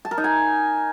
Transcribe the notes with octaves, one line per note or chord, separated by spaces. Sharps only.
A5
A#4
D#4
G#5